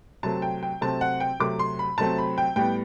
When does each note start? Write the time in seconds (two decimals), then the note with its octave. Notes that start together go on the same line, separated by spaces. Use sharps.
0.23 C3 F#3 A3 C4 A5
0.42 G5
0.63 G5
0.81 C3 F#3 A3 C4 A5
1.01 F#5
1.20 G5
1.40 C3 F#3 A3 C4 D6
1.59 C6
1.79 B5
1.98 C3 F#3 A3 C4 A5
2.18 B5
2.38 G5
2.56 A2 G3 B3 G5